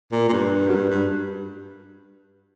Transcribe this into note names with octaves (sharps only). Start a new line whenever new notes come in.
A#2
A#2
G2
F#2
G2
G2